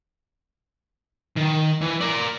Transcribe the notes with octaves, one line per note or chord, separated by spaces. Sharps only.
D#3
E3
A#4 D5